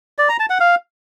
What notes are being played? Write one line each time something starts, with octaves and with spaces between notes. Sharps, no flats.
D5
A#5
A5
F#5
F5